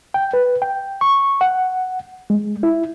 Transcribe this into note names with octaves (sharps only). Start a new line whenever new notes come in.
G5
B4
G5
C#6
F#5
G#3
E4